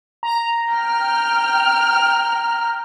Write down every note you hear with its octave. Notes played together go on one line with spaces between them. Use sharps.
A#5
G5 F6